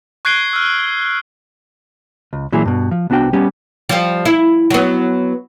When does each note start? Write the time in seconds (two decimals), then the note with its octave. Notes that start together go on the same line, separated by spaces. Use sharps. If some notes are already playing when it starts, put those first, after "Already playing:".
0.25 C#6 F#6 G#6 C7 D7 G7
0.53 E6 F6
2.33 C#2
2.52 A#2 E3 F#3 G#4
2.65 G2 B2
2.91 F3
3.10 C2 B3 D4 F#4 G5
3.33 G3 B3 C#4 G4
3.89 F3 G3
4.25 E4
4.70 F#3 B3